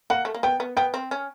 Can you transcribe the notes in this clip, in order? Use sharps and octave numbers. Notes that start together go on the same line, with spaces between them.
A#3 F#5
A3
A#3
B3 G5
B3
B3 G5
C4
C#4